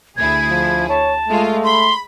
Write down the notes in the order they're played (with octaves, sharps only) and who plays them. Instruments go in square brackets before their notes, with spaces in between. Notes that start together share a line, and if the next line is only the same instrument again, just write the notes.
[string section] D2 E4 G#4 [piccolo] G#6
[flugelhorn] F3
[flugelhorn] C#5 [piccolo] A5
[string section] G#3 F4 [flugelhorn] A3
[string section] B5 [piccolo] C6